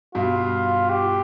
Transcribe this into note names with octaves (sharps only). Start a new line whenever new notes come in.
G2 B2 F4
G4